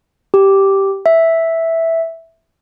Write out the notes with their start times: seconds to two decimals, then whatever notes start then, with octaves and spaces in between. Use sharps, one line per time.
0.34 G4
1.06 E5